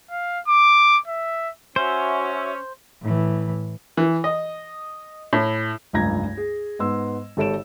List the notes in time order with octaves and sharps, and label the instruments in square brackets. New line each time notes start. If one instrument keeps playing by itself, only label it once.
[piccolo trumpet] F5
D6
E5
[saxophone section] C#4 [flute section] F#4 E5 E6 [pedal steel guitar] C5
[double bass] A2 E3
[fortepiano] E3
D#5
A2
[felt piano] F1 C#2 G2 A#5 G#6 A#6
G#4
G#2 B3 C6 E6
G#1 G4 A4 C#5 D7 E7